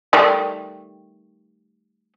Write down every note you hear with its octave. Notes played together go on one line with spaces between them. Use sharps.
D#3 G3 A3